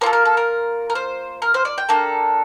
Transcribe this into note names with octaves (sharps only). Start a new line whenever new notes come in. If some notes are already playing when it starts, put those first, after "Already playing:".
A#3 F4 A4 C5
A#4
A4
A#4
A#4
C5
A#4
C5
D5
G5
A#3 D4 A4